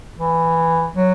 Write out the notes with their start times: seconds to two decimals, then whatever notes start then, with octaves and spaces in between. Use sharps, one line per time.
0.19 E3
0.95 F#3